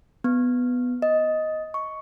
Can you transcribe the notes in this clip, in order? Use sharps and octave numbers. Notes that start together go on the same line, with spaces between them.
B3
D#5
C#6